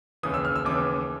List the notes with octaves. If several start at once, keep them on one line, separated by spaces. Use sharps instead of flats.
D#2 C#3 E3 D#6
E6
F6
E6
D#2 C#3 E3 D6